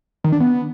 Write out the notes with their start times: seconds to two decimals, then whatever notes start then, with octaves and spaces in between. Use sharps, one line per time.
0.24 D#3
0.32 D4
0.40 B3